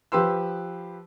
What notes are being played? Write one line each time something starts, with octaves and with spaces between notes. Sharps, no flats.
F3 G4 B4 C6 E6